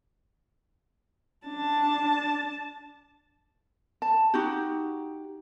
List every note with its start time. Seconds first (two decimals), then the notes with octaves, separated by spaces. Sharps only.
1.47 D4 A5
4.02 A5
4.34 D#4 F#4 G4